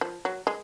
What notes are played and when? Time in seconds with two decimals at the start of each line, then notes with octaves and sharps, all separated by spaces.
0.01 F3
0.25 F#3
0.47 G#3